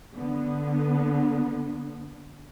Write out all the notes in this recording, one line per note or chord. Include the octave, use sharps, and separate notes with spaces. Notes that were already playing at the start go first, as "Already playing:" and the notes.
D3 B3